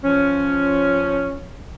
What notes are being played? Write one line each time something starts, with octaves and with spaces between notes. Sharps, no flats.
F3 C#4